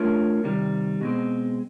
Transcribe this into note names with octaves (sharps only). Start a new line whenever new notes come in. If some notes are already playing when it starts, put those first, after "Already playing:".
Already playing: A3 D4 F4 A#4 C#5
C3 D#3 G3
B2 G#3 C4